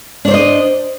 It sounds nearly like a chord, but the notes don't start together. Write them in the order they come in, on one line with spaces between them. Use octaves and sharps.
D4 C#5 C5 D#5